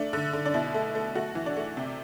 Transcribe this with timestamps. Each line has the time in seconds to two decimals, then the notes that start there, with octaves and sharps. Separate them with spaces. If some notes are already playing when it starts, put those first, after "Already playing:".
Already playing: A3 D4
0.13 D3
0.33 D3
0.45 D4
0.54 B2 E4
0.74 A3
0.95 A3
1.15 A3 F#4
1.35 E3
1.46 D4
1.57 A3
1.77 C3